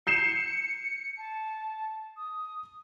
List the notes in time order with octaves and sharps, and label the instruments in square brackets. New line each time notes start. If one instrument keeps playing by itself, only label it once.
[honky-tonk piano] G6 C7 E7 [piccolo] C#7
[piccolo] A5
D#6